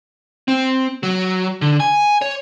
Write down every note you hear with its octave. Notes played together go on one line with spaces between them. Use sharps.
C4
F#3
D3
G#5
C#5